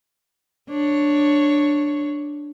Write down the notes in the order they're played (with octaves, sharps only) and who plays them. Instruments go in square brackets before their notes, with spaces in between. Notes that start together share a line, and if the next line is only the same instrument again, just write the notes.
[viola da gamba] D4 C#5